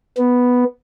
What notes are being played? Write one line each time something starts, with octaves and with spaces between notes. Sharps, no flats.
B3